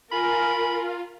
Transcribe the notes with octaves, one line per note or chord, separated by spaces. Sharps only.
F4 A#4 G#5 B5